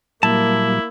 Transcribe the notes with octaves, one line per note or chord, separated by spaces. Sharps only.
A#2 F#3 G3 A#3 E4 A5